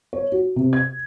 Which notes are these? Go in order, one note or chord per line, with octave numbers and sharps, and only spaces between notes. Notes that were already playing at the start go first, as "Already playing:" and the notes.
C#5
F#4
C3
G#6